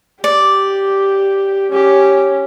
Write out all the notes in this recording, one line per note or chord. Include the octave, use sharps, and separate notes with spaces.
G4 D5
C#4 G4